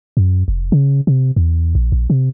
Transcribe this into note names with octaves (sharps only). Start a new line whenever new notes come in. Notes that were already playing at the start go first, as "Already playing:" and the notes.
F#2
F1
C#3
C3
E2
A#1
A#1
C3